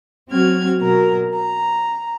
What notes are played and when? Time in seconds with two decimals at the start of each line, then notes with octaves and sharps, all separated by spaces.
0.29 F#3 C4 F#4 F6 G#6
0.79 B2 F#3 A#4 A#5
1.35 A#5